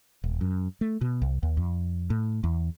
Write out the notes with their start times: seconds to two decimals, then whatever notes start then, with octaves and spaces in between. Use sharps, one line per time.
0.24 D#1
0.41 F#2
0.81 A3
1.01 B2
1.22 C2
1.43 D#2
1.57 F2
2.10 A2
2.44 E2